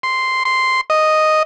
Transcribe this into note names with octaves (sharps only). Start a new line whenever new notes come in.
C6
C6
D#5